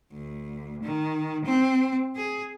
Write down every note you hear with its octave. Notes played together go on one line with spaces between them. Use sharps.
D2
D#3
C4
G#4